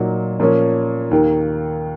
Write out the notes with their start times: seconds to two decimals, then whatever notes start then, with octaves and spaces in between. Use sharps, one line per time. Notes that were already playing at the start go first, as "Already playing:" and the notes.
Already playing: A#2 F#3 A#3 D#4
0.40 A#2 F3 A#3 C#4
1.11 D#2 D#3 A#3